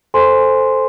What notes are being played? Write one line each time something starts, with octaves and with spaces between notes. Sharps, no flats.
A4 C5 G#5 C6